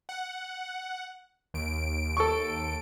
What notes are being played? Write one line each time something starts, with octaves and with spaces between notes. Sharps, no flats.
F#5
D#2 D7
A4 C#6